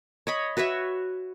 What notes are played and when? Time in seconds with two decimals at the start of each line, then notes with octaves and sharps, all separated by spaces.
0.27 C#5 D#5 B5
0.57 F#4 B4 C#5 E5